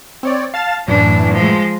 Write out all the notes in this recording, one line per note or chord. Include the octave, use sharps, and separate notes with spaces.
C4 C#5 D5
F5 A5 A6
F#2 A2 E3 D4
F3 G#3